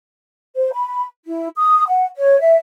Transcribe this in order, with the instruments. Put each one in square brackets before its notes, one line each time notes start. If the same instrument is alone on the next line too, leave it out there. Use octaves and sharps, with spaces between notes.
[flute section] C5
B5
E4
D#6
F#5
C#5
E5